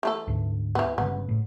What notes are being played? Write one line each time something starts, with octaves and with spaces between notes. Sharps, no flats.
E3 A3 A4
D2 G#2
E3 B3
G1 C#3 B3
A2